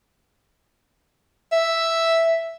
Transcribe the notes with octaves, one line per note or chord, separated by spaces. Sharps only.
E5